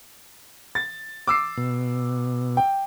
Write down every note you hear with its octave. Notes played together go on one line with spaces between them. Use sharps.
A6
D6 E6 C7
B2
G5